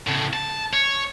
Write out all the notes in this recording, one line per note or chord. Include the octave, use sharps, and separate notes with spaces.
A2 C#3
A5
C#5